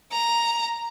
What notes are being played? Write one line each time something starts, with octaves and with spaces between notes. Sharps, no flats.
A#5